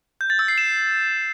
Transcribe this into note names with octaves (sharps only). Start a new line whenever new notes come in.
G6
A6
E6
C7
E7